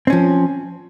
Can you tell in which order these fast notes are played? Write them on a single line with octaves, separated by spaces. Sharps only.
C4 C#4 F3